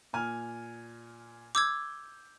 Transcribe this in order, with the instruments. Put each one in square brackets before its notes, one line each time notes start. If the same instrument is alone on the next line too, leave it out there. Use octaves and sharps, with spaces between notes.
[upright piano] A#2 G#5 F6
[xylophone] D6 E6 G#6 [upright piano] G6